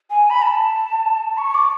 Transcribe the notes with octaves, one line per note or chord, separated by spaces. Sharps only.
G#5
B5
A5
C#6
D6